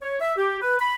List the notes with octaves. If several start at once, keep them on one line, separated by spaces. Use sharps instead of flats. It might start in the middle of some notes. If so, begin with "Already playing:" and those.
C#5
E5
G4
B4
B5